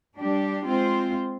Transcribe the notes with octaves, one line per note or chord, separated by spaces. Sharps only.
G3 D4 G4
G#3 C4 F4 C5